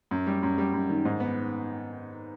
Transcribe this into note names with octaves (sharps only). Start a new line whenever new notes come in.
F#2
G3
F#2
G3
F#2
D#3
G#2
B3